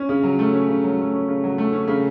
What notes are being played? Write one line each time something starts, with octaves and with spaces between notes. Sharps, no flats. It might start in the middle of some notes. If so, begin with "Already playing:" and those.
Already playing: C#4
C#3
F#3
A3
C#4
C#3
F#3
A3
C#4
C#3
F#3
A3
C#4
C#3